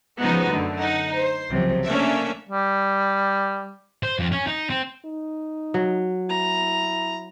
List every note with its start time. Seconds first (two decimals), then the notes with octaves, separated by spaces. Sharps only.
0.19 C#3 F3 G#3 B3 D#4 F#4
0.50 F#2 D3 A3
0.81 D#4 F#5
1.16 C5
1.50 C#2 C3 F3 F#3
1.85 A3 A#3 C#4 D4 E5
2.49 G3
4.03 C5
4.19 F2
4.32 C#4
4.47 D#4
4.70 C4
5.05 D#4
5.74 F#3
6.29 E4 A#5